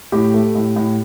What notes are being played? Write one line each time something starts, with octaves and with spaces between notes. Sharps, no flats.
A2 G4
A3
A2
A2